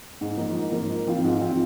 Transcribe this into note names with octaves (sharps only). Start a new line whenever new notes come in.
G#2
F3 A#3 D#4
G#2
F3 A#3 D#4
G#2
F3 C4 F4
G#2
F3 C4 F4